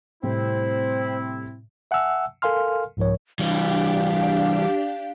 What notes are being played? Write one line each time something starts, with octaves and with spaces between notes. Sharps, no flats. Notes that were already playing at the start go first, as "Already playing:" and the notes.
A2 C3 G3 C4 E4 C5
E5 F#5 G#5 A5 E6
A4 A#4 F5 G#5 C6 F6
C2 G#2 F3 A#4 C#5
E3 G3 D4 G4 F5